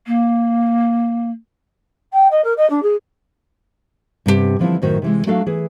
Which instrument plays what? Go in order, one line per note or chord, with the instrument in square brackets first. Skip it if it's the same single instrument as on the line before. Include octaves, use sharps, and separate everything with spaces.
[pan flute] A#3
[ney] G5
D#5
A#4
D#5
D4
G#4
[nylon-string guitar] G2 C3 A#3 G4 F#5
D3 E3 F3 C4 D4 E4
F#2 A2 D#3 F#4 C5 E5
C3 E3 G#3
F#3 A3 D4 F#4 A4 F5
E3 G#4